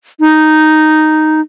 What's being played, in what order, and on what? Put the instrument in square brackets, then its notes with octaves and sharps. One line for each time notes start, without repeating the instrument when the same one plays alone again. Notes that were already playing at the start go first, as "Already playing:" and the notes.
[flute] D#4